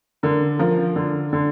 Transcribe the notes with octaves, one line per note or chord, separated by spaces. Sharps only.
D3 A#4
F3 A#4
D3
D3